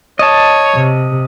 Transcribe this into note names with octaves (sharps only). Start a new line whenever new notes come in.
C#5 D#5 A5
C3